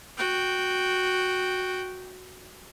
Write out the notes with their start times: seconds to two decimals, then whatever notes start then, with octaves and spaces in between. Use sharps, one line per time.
0.17 F#4 G5